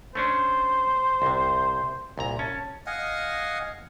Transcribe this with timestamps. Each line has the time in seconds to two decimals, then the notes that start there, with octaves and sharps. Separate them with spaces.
0.15 A3 C#4 D4 C5
1.22 C2 C3
2.18 C2 A#2 A#5
2.39 C#4 A5
2.86 D#5 F5 F#5 G#5